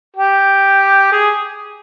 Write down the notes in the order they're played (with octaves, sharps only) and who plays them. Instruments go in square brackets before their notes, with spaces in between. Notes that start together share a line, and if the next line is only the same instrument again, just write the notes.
[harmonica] G4
G#4